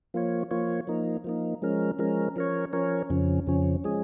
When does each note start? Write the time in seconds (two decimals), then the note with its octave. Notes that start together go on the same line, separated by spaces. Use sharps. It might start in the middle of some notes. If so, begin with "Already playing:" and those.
0.14 F3 A#3 F4 C#5
0.51 F3 A#3 F4 C#5
0.87 F3 A#3 D#4
1.24 F3 A#3 D#4
1.62 F3 G#3 C#4 A#4
1.99 F3 G#3 C#4 A#4
2.36 F3 C#4 A#4 C#5
2.73 F3 C#4 A#4 C#5
3.10 F2 C#3 F3 C#4
3.47 F2 C#3 F3 C#4
3.84 F3 G#3 C#4 G#4